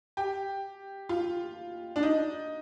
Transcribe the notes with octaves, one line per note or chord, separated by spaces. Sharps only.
G4
F4
D4
D#4